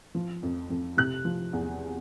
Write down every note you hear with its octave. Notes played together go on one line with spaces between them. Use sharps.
F3
F2
F2
C3 F#6
F3
E2